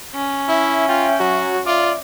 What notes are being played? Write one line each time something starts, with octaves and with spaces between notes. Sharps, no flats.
C#4
E4 E5
F4 G5
F#3 F#4
F4 D5 E5